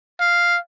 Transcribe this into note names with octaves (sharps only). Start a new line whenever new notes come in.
F5